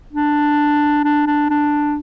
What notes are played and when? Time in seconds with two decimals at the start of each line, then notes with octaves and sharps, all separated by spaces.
0.12 D4
1.04 D4
1.26 D4
1.50 D4